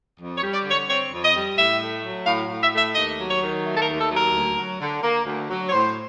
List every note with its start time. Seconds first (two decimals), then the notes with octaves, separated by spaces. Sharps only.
0.19 F2
0.37 C#5
0.43 G3
0.54 D5
0.66 D3
0.71 C#5
0.88 C4 C#5
1.11 F2
1.23 D#5
1.35 G3
1.57 A2 E5
1.81 A3
2.03 F#3
2.27 A2 F5
2.50 A2
2.61 E5
2.73 A3 E5
2.95 D#2 D#5
3.19 F#3
3.30 C#5
3.42 D#3
3.64 A3
3.75 A4
3.82 A#4
3.88 D#2
3.99 A4
4.11 F#3
4.17 A#4
4.33 D2
4.57 F#3
4.80 D3
5.03 A#3
5.25 D2
5.49 F#3
5.67 C#5
5.72 A2 C5